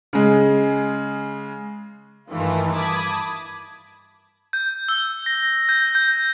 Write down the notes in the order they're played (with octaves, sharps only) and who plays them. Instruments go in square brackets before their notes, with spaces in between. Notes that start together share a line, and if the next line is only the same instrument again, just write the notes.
[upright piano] C#3 G#3
[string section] G2 D#3 E3 A3 A#3 F4
A5 B5 D6 D#6 G#6
[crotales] G6
E6
A#6
G6
G6